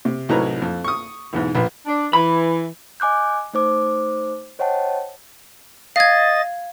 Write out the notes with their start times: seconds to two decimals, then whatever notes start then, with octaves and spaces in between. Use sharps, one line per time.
0.05 C3
0.29 C2 A2 F#3 D#4 B4 A#5
0.62 F2
0.84 C#6 D#6
1.33 B1 E2 G#2
1.55 A#1 F4 B4
1.86 D4
2.13 E3 B5
3.00 D#5 G#5 D6 F#6 G6
3.53 A3 D#4 C5 D6
4.59 C5 C#5 D#5 F#5 G5 A5
5.96 D#5 F5 G#6 A6